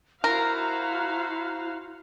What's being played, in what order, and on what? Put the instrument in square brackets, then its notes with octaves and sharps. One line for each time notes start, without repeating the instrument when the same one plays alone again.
[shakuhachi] E4 [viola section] F#4 C5 F5 [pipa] A#4 [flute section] A5 A#5 F#6